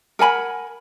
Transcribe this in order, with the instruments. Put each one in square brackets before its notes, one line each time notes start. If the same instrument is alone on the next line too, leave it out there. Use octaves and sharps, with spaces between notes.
[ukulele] A#4 F#5 G#5 B5